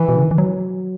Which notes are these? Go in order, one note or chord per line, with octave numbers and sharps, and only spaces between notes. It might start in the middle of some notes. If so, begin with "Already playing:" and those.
Already playing: E3
B2
C#3
D#3
E3
F#3